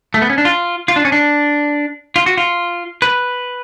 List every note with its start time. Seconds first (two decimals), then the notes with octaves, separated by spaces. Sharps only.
0.14 A3
0.22 B3
0.30 C#4
0.38 D4
0.45 F4
0.88 F4
0.96 D4
1.05 C#4
1.12 D4
2.16 F4
2.26 F#4
2.37 F4
3.02 B4